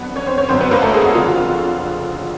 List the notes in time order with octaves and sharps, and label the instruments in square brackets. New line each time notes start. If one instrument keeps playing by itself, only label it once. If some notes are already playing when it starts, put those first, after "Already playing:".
Already playing: [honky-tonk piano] F2 D3 F#3 B3 B4
C#4 C#5
C4 C5
C#4 C#5
F#1 F#2 D3 F#3 B3 C4 C5
B3 B4
A#3 A#4
A3 A4
G#3 G#4
F#4
F#1 F2 D3 F4
F#4
F4